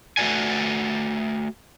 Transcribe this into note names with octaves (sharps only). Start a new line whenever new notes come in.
A3 F#4 B4 D5 G#5